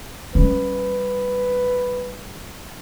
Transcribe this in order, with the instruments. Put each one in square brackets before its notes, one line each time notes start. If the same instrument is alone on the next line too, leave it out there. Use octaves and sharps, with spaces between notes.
[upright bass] G3 C#4 [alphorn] B4